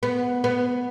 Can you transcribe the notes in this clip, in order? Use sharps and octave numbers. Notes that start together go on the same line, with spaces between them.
B3
B3